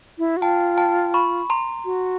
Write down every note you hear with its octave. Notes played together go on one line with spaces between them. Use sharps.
E4
F#4
F4 G5 A5
G5 A5
B5 C#6
A#5 C6
F#4